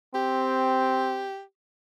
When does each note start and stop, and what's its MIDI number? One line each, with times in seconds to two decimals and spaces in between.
0.15 1.30 60
0.15 1.42 67